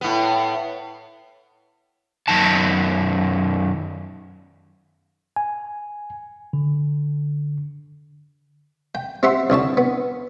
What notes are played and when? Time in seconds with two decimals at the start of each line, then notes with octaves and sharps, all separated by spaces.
0.01 A2 B3
2.28 F#2 D#3 A5
5.36 G#5
6.53 D3
8.95 G5
9.23 C4 G4 E5 F#5 C6
9.50 C2 D3 C#5 A5
9.77 B3